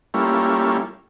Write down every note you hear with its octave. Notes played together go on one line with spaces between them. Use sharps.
G3 A3 A#3 C#4 E4 F4